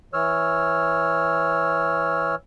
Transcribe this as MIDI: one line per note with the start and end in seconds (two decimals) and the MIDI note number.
0.13 2.35 52
0.13 2.35 73
0.13 2.35 88
0.13 2.35 89